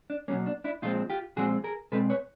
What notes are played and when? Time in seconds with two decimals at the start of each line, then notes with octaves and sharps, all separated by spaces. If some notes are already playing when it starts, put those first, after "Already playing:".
0.10 D4
0.28 B2 F#3 A#3 C#4
0.46 D4
0.64 D4 E4
0.82 A#2 F3 G#3 C4 D#4 F4
1.10 F4 G4
1.36 A#2 F3 G#3 C4 F#4 G#4
1.64 G#4 A#4
1.92 B2 G#3 C4 A4 B4
2.10 B4 C#5